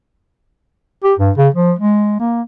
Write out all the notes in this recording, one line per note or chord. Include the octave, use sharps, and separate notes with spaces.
G4
G2
C#3
F3
G#3
A#3